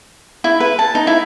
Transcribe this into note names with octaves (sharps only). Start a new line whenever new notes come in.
E4
B4
A5
D#4
E4